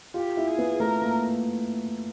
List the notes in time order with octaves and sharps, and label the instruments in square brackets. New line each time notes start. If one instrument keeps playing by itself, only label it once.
[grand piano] F4 [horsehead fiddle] G4
[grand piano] E4
[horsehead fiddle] G#4
[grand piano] B3
[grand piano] A3 [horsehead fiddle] A#4
[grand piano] A#3